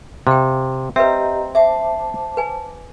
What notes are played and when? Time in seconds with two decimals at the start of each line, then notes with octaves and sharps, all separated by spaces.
0.27 C3 F5 G5
0.96 C4 G4 B4 D#5 E5 A#5
1.55 C5 E5 A5 D6
2.37 B4 G#5